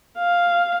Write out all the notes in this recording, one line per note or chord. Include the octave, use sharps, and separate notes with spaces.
F5